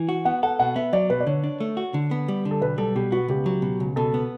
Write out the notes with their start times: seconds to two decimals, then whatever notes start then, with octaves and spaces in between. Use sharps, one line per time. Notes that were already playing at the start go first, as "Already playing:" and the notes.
Already playing: E3
0.09 F#4
0.25 B3 F#5
0.43 A4 F#5
0.59 B2 F#5
0.76 B3 E5
0.93 F#3 D5
1.10 B2 B4
1.20 D5
1.27 D3 C#5
1.44 D4
1.60 A3
1.77 F#4
1.94 D3
2.11 B3
2.28 G3
2.45 D3
2.51 A4
2.62 B1 B4
2.78 G3 A4
2.95 B2 G4
3.12 B3 F#4
3.28 C#2 G4
3.46 F#3
3.62 B2
3.80 C#2
3.96 B2 A4
4.14 B3